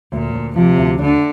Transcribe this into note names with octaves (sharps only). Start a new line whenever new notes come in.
D2 A#2
D2
C3 F3
D2
D3 D4